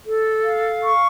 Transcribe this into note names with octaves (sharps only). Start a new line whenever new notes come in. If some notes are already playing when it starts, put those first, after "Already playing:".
A4
F5
C#6